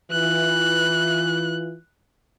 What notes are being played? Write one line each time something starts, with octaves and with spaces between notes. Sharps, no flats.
E3 F4 F#6